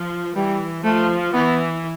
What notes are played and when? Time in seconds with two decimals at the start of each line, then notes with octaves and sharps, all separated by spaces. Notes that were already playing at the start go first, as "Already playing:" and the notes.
Already playing: F3
0.36 E3 G3
0.84 F3 A3
1.34 E3 B3